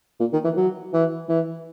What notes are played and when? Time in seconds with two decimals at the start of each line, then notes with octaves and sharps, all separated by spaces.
0.20 A#2
0.33 D#3
0.44 E3
0.57 F#3
0.93 E3
1.29 E3